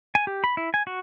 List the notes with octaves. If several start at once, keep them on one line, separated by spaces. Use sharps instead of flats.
G#5
G4
B5
E4
G#5
F#4